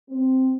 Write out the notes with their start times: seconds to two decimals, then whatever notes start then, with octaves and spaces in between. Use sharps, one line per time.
0.10 C4